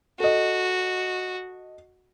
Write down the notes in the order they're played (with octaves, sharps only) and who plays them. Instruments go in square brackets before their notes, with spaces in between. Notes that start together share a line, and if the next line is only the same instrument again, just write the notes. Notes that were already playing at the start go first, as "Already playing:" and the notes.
[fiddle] F#4 [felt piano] A4 D#5